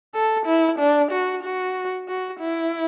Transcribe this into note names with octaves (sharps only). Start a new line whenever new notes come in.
A4
E4
D4
F#4
F#4
F#4
E4